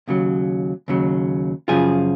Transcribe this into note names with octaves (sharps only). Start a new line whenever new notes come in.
D#2 C#3 F#3
D#2 C#3 F#3
F#2 C#3 F3 F4 G#4